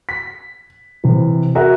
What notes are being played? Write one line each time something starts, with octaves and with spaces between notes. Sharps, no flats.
B6
C3 E3
F#4 G#4 A#4 E5 A#5